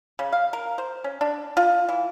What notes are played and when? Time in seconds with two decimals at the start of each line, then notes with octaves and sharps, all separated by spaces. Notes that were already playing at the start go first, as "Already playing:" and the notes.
0.19 C#3
0.32 F5
0.53 A#4
0.78 C5
1.04 C#4
1.21 D4
1.57 F4
1.89 E3